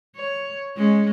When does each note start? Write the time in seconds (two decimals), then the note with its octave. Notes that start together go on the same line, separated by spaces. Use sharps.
0.16 C#5
0.77 G#3 C#4